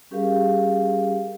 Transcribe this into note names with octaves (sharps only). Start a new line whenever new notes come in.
G3 C#4 G4 G#4 A#4 F5